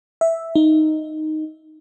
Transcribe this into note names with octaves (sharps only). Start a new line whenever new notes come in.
E5
D#4